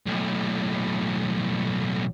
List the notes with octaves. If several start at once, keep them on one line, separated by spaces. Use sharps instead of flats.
B1 A2